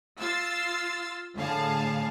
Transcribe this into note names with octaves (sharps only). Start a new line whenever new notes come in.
F4 E6 A6 C7
A2 D3 G#4 F5 A5